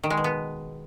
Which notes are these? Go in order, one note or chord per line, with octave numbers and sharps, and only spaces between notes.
D#3
G#3
B2
B3